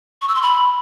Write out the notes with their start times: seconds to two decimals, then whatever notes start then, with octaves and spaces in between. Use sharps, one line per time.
0.22 C#6
0.28 E6
0.35 C6
0.42 B5